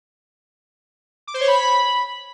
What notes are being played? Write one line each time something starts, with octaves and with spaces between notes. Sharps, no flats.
D6
C5
C#5
B5